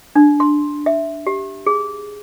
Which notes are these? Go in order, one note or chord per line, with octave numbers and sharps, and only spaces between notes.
D4
C6
E5
G4
G#4